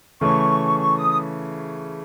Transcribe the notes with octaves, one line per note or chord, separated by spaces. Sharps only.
C#3 E3 A3 C#4 C#6
C#6
D#6